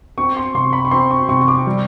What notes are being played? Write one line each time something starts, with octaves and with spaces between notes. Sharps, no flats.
C4 C#6
C6
C3 C6
B5
C#6
C4 C6
C#6
C3 C#6
C#6
D6
G3